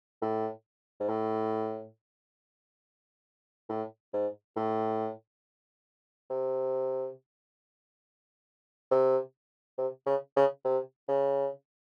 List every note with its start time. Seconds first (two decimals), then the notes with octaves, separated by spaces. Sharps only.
0.21 A2
1.00 G#2
1.08 A2
3.69 A2
4.13 G#2
4.56 A2
6.30 C3
8.91 C3
9.78 C3
10.06 C#3
10.36 C#3
10.65 C3
11.08 C#3